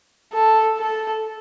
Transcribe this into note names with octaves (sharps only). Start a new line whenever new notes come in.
A4
A4